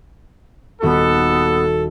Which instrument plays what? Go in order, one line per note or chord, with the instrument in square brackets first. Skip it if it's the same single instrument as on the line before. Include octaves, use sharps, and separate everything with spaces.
[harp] D#1 F#4 C#6 [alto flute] B3 [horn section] A4